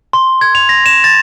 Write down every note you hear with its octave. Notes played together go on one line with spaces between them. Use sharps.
C6
G#6
F7
A#6
E7
A6